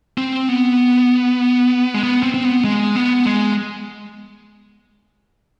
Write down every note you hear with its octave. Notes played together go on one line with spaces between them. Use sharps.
C4
B3
G#3
B3
C4
C4
B3
G#3
B3
G#3